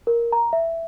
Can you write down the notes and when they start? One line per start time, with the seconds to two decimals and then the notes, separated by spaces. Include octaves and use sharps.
0.07 A#4
0.32 A#5
0.53 E5